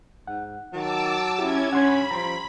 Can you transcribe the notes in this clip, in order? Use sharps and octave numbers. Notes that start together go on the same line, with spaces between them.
G#2 F#5
D#3 F#3 A5 D6 E6
C#4 E4 G4 G#6
G2 C#4 F#5 B5 C6 G#6
F3 G3 A#5 C6